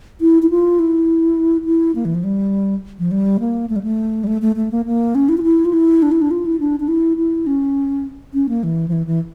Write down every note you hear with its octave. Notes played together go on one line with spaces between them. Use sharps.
E4
E4
F4
E4
E4
A#3
E3
F3
G3
F3
G3
A#3
A3
G3
A3
G3
A3
A3
A3
A#3
A#3
C#4
E4
F4
E4
F4
E4
D4
E4
D4
F4
E4
D4
D4
E4
E4
C#4
C#4
A#3
E3
F3
E3
E3